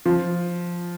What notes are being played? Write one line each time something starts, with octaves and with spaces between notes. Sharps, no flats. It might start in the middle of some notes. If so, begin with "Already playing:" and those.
F3